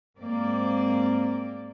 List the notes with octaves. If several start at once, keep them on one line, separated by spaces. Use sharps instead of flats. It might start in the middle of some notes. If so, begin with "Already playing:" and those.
G#2 A#3 C4 D5